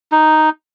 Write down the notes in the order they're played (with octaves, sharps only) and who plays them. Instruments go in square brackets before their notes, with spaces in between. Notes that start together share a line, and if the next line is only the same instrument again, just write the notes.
[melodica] D#4